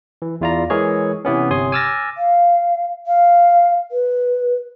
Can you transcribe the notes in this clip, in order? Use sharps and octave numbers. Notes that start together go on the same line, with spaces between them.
E3
E2 E4 F4 D5 A#5
E3 G#3 G#4 A#4 C#5
C3 E3 B3 C#4
G1 C3 C#5 G#5 C6 D#6
G#5 D6 E6 F6 A6 A#6
F5
F5
B4